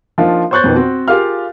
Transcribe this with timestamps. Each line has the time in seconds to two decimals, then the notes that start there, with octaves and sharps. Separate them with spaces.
0.18 F3 A#3 D4 D#4 F4
0.51 C5 C#5 C#6 F#6 G6 A6
0.64 F2 B2 D#3 B3
0.76 C4 F#4
1.08 F4 G4 G#4 A#4 F5 F6